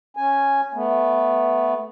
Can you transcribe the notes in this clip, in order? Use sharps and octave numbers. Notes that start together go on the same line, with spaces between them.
C#4 G#5
A3 B3